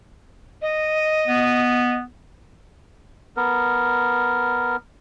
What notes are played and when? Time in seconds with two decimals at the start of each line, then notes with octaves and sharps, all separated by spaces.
0.62 D#5
1.28 B3
3.37 B3 A#4